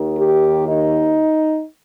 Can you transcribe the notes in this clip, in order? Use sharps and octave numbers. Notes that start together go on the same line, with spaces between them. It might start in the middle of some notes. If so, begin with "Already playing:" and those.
Already playing: D#2 D#3
G4
D#4